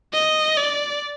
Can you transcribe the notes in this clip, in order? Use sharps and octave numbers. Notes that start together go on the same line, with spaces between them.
D#5
D5